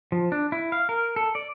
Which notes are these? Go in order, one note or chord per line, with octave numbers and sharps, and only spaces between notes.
F3
D4
E4
F5
A#4
A4
D5